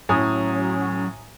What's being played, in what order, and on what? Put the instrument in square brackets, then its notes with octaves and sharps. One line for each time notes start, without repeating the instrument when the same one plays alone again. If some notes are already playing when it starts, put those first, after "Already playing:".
[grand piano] A2 [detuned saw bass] F#3 [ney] C#4 [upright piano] G#5 A#5 D#6